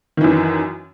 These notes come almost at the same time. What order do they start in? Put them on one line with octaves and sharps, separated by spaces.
D#3 E3 F#2